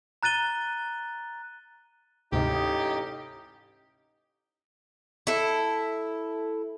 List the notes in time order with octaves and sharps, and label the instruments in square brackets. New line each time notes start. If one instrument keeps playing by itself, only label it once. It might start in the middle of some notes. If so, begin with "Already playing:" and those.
[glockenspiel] A#5 F#6 A6 D#7 G7
[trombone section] A1 D#4 [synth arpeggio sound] D2 G#2 C3 [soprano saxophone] G4
[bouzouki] E4 A4